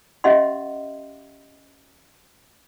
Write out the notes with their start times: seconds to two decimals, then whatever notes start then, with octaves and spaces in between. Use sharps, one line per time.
0.24 C#4 G4 D#5 E5 F#5 C6